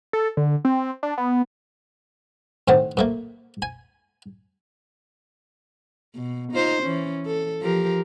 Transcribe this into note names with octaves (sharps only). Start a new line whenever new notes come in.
A4
D3
C4
D4
B3
A2 D#3 C4 F#5
A#2 A3 A#3
G#5
B2
D#4 F4 C5
E3 C#4
A4
F3 G4 A#4